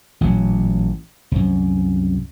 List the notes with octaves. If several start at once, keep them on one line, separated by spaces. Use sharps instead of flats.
A1 A#2 F#3
C2 F#2